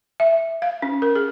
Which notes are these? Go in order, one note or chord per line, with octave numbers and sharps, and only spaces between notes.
E5
F5
C#4
A#4
G#4